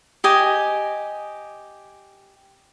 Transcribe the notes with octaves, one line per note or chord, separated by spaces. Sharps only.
G4 D#5 G#5